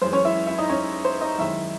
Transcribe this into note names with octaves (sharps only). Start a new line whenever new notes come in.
F#2 E3 G#3 C5
C#4 C#5
E4 E5
E4 E5
D#4 D#5
C#4 C#5
C5
D#4 D#5
F#2 D#3 G#3 E4 E5